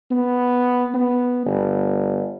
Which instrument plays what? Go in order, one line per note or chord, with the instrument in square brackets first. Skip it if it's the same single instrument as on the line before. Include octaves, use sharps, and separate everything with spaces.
[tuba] B3
B3
G1